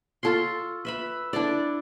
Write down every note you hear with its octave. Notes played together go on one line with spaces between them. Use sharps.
F4 A4 C#5 C6
B4 E5 B5
D4 E4 A4 D5